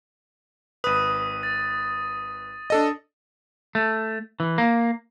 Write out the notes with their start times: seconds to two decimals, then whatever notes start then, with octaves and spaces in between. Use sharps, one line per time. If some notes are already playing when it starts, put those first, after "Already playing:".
0.84 G#1 B4 D#6 D#7
1.43 A6
2.70 D4 A4 D#5
3.75 A3
4.40 E3
4.58 A#3